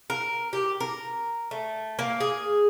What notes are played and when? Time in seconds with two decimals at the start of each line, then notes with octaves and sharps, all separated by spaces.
0.10 A#4
0.53 G4
0.80 A#4
1.51 A3
1.99 A#3
2.20 G#4